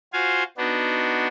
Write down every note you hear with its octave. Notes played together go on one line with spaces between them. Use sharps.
F4 F#4 C5 F5 G#5
B3 D4 D#4 F#4